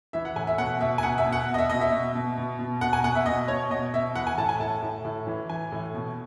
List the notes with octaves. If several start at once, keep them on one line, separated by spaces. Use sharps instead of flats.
E3 E5
F#5
A2 G#5
E5
B2 F#5
B2 E5
G#5
B2 F#5
E5
B2
F#5
B2
D#5
E5
B2 D#5
E5
B2
B2
B2
B2
B2 F#5
G#5
B2 F#5
E5
B2 D#5
B2 C#5
B2 D#5
B2 E5
E3 F#5
G#5
A2 A5
G#5
A2 A5
A2
A2
E3
E3 G#5
A2
B2